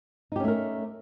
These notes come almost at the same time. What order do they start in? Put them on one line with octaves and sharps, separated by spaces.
D#4 G4 C#4 A3 A#4